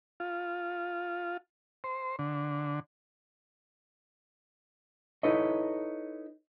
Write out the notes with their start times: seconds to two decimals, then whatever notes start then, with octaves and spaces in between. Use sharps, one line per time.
0.20 F4
1.84 C5
2.19 D3
5.23 D#4 E4 A4 B4 C#5 D#5